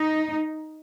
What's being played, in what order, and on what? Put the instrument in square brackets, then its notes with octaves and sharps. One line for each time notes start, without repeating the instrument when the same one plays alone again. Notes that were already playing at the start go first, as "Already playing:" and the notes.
Already playing: [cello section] D#4